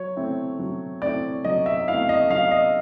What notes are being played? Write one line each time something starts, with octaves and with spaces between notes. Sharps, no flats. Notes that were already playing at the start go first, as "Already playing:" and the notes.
Already playing: F#3 C#5
A3 C4 E4
F#3
A3 C4 E4 D5
F#3 D#5
E5
A3 C4 E4 F5
D#5
F#3 F5
D#5